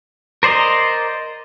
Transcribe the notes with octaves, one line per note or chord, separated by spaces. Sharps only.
A#4 C5 D5 D#5 A#5